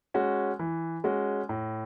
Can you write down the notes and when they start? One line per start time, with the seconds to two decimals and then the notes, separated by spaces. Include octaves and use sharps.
0.14 G#3 C#4 F#4
0.59 E3
1.04 G#3 C#4 F#4
1.49 A2